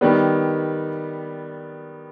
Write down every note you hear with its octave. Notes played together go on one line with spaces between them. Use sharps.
D#3 G3 B3